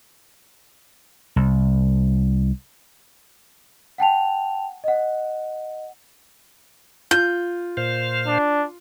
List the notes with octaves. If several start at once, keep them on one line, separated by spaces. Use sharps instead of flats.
C2
F#5 G5 A5 F7
D#5 F#5
F4 G6
A#2 C5 F5
D4